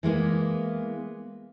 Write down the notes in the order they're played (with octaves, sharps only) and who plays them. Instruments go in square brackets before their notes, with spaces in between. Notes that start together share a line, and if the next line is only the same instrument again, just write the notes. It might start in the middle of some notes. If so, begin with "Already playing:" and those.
[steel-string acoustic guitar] E3 G#3 A#3 B3